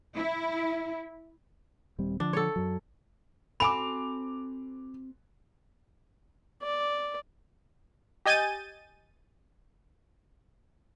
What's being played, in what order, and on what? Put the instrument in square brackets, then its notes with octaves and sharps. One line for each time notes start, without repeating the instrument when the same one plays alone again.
[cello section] E4
[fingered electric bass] D#1 G3 C4
[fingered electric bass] D3 F3 [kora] D4
[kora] A4 C#5
[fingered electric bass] F#2 F#3
[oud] C4 F#4 A4 [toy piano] G#5 B5 [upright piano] D6 F7
[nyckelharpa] D5
[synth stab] G4 D#5 G#5 G6 A6 D#7